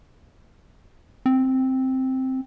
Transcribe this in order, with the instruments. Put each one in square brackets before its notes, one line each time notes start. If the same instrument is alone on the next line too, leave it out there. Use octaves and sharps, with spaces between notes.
[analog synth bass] C4